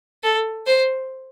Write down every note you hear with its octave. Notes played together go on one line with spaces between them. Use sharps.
A4
C5